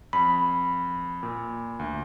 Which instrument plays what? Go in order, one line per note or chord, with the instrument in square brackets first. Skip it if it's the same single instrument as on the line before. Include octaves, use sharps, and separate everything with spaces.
[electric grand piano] F2 [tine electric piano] B5
[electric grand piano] A#2
D2